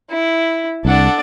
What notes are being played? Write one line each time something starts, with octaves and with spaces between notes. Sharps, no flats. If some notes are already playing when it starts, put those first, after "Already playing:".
E4
C2 D4 A4 D5 F#5